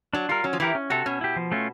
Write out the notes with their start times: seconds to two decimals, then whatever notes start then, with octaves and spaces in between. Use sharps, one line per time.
0.13 F#3 D4
0.29 G3 F4 A#4
0.44 F#3 C#4
0.53 F3
0.60 E3 E4 G4 A#4
0.75 C#4
0.90 C3 F#4 A4
1.06 B2 C#4
1.21 E4 G4
1.36 F3
1.52 A3 C#4 F4